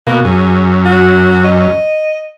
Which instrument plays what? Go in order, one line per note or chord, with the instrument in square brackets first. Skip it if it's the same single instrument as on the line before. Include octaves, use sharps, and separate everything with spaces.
[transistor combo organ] B2 [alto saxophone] A#3
[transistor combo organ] F#2 [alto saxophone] G#4
[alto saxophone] F#4
D#5